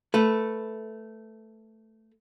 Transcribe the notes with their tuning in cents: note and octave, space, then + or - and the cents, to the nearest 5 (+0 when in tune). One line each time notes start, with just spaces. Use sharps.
A3 +0 B4 +0